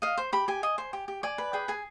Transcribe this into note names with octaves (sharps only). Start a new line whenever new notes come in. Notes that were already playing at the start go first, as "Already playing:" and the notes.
D#5 F5
C5
G4 B5
G4 G#5
D#5
C5
G4
G4
D5 G#5
B4
G#4 G5
G#4 G#5